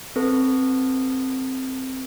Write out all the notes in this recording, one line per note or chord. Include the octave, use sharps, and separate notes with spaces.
C4 A4 B4